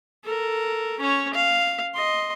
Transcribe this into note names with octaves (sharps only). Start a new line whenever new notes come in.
A4 A#4
C#4 C#5
F5
D#5 C6